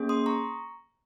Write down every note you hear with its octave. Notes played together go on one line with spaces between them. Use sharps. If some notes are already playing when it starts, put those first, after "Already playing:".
Already playing: A#3 C#4 G#4
C6 D#6
A#5 C#6